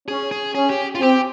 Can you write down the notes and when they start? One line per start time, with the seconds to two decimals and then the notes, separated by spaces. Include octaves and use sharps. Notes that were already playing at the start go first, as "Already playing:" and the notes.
0.08 C#4 G#4
0.31 G#4
0.55 C#4 G#4
0.70 G4
0.95 F4
1.00 C4 G4